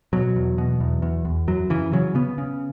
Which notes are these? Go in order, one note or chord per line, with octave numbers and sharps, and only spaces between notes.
B2 F#3
E2
B2
E2
E2
E2
F#2 F#3
C#3 E3
C#3 F#3
C#3 B3
C#3